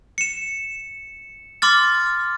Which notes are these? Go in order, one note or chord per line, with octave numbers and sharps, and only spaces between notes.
C#7 E7
C6 D6 F6 A6